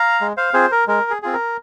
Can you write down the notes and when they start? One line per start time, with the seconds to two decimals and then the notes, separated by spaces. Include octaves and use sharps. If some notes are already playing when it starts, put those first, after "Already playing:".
Already playing: F5 A#5
0.21 G#3
0.37 C5 F5
0.54 C4 F4 G#4 C5
0.71 A#4
0.88 G#3 A#4
1.10 G#4
1.22 C4 F4 G#4
1.33 A#4